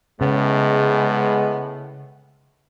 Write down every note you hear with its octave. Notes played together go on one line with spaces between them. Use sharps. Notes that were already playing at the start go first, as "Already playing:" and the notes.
A2 C#3 G#3 B3